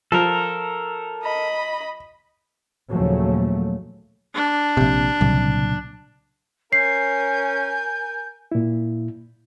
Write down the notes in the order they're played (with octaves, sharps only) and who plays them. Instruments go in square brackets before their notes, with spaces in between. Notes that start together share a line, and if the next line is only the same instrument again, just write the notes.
[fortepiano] F3 [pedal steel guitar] A4 A#4
[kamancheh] D#5 B5
[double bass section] D#2 A#2 C#3 F3 F#3 A3
[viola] D4
[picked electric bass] A#1 C3
[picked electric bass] C2 [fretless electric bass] A#2 C#3 F#3
[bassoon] C#4 [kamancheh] A#4 G#5 [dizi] G6 [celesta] C7
[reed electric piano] A#2 E4